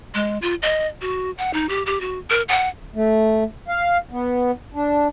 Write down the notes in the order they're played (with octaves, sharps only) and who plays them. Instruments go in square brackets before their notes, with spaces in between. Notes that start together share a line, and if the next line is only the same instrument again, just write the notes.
[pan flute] G#3
F4
D#5
F#4
F#5
D#4
G4
G4
F#4
A#4
F#5
[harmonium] A3
F5
B3
D4